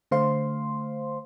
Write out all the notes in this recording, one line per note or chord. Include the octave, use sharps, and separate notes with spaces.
D3 A3 C5 F5 C6